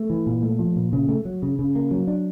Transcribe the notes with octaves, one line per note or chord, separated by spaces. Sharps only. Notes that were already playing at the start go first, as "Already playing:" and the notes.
Already playing: A3
E3
A#2
A3
F3
A#2
C#3
A3
F#3
C#3
C#3
A#3
F#3
D4